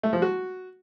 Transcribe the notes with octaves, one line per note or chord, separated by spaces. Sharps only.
A3
F3
F#4